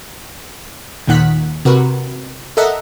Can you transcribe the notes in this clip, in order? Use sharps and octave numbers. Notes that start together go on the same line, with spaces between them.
D#2 A#2 D#3 F#5 F#6 B6
C3 F#4 A#4 B4
A4 A#4 D#5 E5 F#5